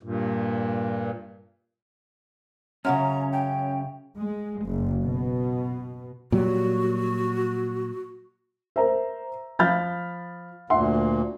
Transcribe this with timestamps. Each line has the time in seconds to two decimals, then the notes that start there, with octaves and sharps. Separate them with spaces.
0.03 G2 A#2
2.85 F#2 A2 C#3 C#4 F#5 A#5 F6
3.33 G5
4.16 G#3
4.64 F#1
5.02 B2
6.32 A#2 F#3 G3 F#4
8.76 A#4 C5 E5 A#5
9.59 F3 F5 B5 F6 G6 A6
10.70 D2 A#2 E5 F#5 C6